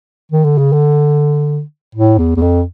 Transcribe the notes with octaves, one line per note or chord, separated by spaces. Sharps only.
D#3
D3
C#3
D3
A2
E2
E2
F2